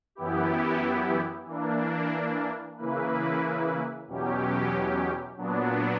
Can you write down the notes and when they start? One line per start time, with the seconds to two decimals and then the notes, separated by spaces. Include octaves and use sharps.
0.15 F#2 E3 B3 E4 G4
1.46 E3 A#3 D4
2.76 C#3 E3 A#3 E4 B4
4.07 E2 B2 F#3 C#4 G4
5.37 A#2 F#3 B3 D4